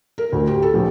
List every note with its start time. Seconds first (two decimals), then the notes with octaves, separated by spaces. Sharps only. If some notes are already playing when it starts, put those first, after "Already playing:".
0.18 A#4
0.32 D2
0.47 G4
0.62 A4
0.74 A#1